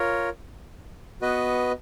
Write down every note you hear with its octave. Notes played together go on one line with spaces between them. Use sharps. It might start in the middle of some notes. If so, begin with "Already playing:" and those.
Already playing: F4 A#4 C#5
B3 F#4 B4 D#5